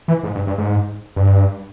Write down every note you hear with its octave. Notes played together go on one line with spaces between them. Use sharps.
E3
G#2
G2
G2
G#2
G2